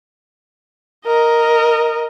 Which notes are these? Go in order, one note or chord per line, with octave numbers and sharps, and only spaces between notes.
A#4 D#5